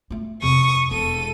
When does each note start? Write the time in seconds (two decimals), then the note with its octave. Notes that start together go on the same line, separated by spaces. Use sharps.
0.10 A3 F4
0.42 F2 C3 C#6 D#6
0.91 E1 A4 D#7